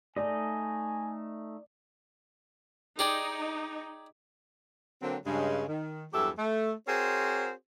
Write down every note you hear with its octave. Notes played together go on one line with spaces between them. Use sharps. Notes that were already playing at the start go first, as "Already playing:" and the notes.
A3 D#4 D5 D#5 G#5
D#4 G4 G#4 D5
D3 F#3 A#3 C4
G2 C#3 G#3
D#3
E2 G2 F#3 G4 A4 E5
A3
C4 F#4 G#4 A#4 C5 C#5